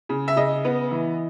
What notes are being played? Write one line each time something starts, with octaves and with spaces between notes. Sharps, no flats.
C#3
E5
C#3 D#5
B3
E3